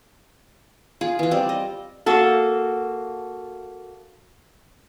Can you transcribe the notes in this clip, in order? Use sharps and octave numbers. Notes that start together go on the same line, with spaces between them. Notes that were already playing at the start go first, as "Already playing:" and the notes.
F4 G#4
E3 F4
G3 C4 D5
D#5
A#3 F#4 A4